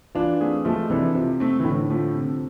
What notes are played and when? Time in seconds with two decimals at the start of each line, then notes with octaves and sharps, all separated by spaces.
0.15 E3 D4 F4
0.41 A3 C4 G#4
0.65 F3 G#3 A3
0.90 C3 E3 D4 A4
1.15 C3 F3
1.40 A3 C4
1.60 E3
1.65 A2 D3
1.90 F3 A3
2.15 C3